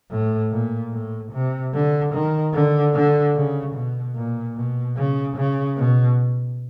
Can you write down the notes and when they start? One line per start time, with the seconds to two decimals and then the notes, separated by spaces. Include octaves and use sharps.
0.11 A2
0.51 A#2
0.92 A2
1.32 C3
1.73 D3
2.13 D#3
2.54 D3
2.94 D3
3.35 C#3
3.74 B2
4.15 A#2
4.56 B2
4.97 C#3
5.36 C#3
5.77 B2